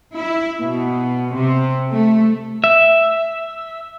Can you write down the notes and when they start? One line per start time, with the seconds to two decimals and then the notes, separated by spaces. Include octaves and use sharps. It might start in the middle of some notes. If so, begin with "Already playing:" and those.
0.16 E4
0.61 B2
1.35 C3
1.91 A3
2.64 E5